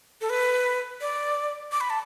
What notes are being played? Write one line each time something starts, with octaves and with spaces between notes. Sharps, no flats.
A4
B4
D5
D6
B5
A5